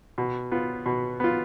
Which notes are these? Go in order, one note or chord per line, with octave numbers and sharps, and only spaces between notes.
B2
B3 F4
B2
B3 F4